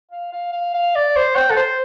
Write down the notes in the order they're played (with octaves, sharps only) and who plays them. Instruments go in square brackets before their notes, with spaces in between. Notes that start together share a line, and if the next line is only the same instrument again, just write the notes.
[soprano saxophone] F5
F5
F5
F5
D5
C5
G5
A4
C5